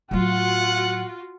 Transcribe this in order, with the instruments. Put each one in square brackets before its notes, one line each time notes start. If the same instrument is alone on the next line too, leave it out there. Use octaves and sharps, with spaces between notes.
[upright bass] A2 F#3 [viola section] F4 F#4 [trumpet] F#5